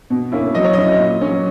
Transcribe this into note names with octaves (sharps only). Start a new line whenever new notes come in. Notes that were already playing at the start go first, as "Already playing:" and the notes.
B2
A#3 C#4 E4
F#3 D#5
C#5
C#4 E4 D#5
A#2
F#3 C#4